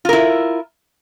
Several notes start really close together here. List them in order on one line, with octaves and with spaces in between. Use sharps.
F4 A#4 E4